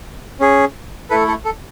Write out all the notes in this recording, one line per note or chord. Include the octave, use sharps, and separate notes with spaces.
C#4 G#4
A3 E4 A4 B4
A4
A4